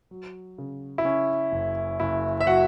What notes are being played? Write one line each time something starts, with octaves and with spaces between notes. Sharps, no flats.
F#3
C#3
E4
C#3 C#4
F#1
F#1 E4
E5
F#3 F#4 F#5